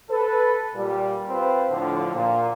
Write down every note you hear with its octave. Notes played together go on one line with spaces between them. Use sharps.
A4 B4
A#2 G3
C4 F4 B4 C5
A2 D3 F3
A#2